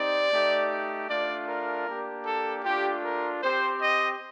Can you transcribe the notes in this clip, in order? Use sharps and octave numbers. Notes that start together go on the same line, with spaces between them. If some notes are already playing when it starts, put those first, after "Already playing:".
Already playing: C4 D#4 G4 D5
A3 D#4 G4
A3 D4 F4 D5
A#4
A#3 D4 G4
A4
A3 D4 F4 G4
A#4
C4 G4 C5
D#5